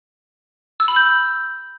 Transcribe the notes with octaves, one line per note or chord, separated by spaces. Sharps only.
E6
B5
G6